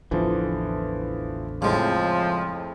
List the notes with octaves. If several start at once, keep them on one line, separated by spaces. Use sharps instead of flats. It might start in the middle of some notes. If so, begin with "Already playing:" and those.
A1 E2 D3 E3 F3
F2 A2 C#3 F3 G#3